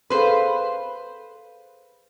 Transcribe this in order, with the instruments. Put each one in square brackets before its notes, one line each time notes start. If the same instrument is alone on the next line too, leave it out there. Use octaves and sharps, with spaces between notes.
[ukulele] G#4 A4 F5 [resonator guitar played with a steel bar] B4 C5